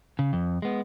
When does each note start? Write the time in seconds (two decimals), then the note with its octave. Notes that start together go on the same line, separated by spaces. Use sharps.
0.19 C#3
0.33 F2
0.62 G#3 B3